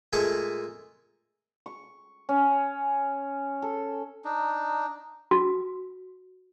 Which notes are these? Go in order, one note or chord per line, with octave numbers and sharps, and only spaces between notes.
A#2 G#3 A3 G#4 A5 C#6
C#6
C#4
A4
D4 D#4
F#4